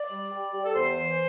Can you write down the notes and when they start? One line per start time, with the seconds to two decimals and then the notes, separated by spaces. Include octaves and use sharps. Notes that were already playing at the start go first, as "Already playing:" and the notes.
Already playing: D5
0.10 G3
0.30 G3
0.52 G3
0.64 A4
0.74 E2 C5
0.96 E3